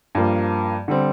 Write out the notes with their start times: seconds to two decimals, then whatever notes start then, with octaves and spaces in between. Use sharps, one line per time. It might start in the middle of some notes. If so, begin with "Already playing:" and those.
0.15 G2 F3 A#3
0.88 D3 G3 C4